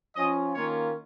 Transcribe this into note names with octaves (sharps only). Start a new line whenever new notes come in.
F3 C#4 F4 D#5
D#3 A#3 C#4 F4 C#5